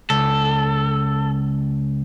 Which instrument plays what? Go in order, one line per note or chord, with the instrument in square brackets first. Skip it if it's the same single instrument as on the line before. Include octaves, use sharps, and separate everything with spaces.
[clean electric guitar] C#2 [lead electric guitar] A4